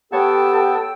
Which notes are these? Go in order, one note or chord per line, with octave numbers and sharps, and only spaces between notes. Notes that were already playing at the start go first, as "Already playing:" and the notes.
B3 G4 A4 C#5 F#5 G5 A5 E6